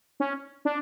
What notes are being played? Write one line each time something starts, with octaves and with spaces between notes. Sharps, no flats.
C#4
D4